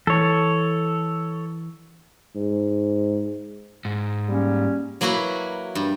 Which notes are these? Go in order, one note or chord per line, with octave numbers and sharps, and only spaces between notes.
E3 A4 C#5
G#2
G#2
G3 A#3 C#4
F#3 A#3 E4 F#4 B4
G2